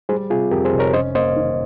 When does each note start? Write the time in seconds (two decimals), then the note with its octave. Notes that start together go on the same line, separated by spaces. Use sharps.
0.09 G3 G#4 C5
0.30 C3 F4 G#4
0.51 F2 G4 A#4
0.65 G#4 C5
0.72 F1
0.79 A#4 C#5
0.93 C#4 C5 D#5
1.15 A#3 C5 D#5
1.36 D#3